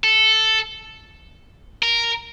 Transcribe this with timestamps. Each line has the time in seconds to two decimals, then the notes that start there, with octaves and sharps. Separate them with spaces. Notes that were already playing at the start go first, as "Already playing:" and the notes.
0.04 A4
1.83 A#4